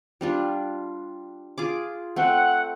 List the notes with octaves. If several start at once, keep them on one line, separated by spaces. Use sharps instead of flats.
G3 D4 F4
F4 G#4 D6
A3 C4 F#5 G5